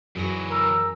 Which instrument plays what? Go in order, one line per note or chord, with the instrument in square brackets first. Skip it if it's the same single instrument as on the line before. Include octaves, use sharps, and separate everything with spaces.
[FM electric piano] F#2 G#4 A#6 [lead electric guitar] E3 F#3
[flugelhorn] A#4 [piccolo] E6